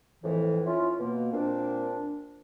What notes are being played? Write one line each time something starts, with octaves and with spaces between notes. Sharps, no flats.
F2 A2 E3
C#4 E4 F4
B2 A#3
A#2 C4 D4